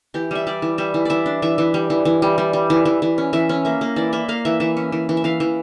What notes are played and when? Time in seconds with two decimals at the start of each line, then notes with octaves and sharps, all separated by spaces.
0.14 E3 G4
0.31 G3 E5
0.47 G3 D5
0.62 E3
0.78 G3 E5
0.94 E3
1.05 E3 D5 E5
1.26 D4
1.42 E3 E5
1.58 E3
1.74 G3
1.90 E3
2.05 E3
2.22 G3
2.38 G3
2.53 G3
2.70 E3
2.85 E3
3.02 E3
3.18 C#4
3.33 E3 E5
3.49 C#4
3.65 A#3 E5
3.81 A#3
3.96 E3 D5
4.13 A#3 E5
4.29 A#3 F5
4.45 E3 E5
4.60 E3 E5
4.77 C#4
4.92 E3
5.09 E3
5.17 E5
5.24 E3 F5
5.40 E3